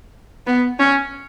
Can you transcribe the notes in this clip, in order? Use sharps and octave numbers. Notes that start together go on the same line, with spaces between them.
B3
C#4